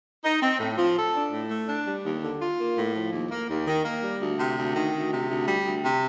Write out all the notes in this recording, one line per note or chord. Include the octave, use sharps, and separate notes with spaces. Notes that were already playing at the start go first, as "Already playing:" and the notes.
D#4
C4
A2
F3
A4
D4
A2
A3
D4
G3
D#2
D3
F4
A#3
A2
F3
D#2
A#3
D#2
D#3
A#3
G3
D2
C3
D2
D#3
D2
C3
D2
G3
D2
C3